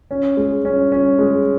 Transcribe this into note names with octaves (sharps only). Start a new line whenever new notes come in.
C#4
G#3
C#4
C#4
G#3